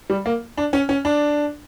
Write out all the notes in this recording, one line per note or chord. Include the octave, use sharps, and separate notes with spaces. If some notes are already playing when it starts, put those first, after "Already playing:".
G3
A#3
D4
C#4
C#4
D4